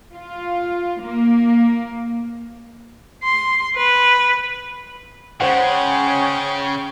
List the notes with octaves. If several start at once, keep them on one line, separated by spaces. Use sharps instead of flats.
F4
A#3
C6
B4
C#3 G#3 C#4 G#4 C5 F#5 G5 C#6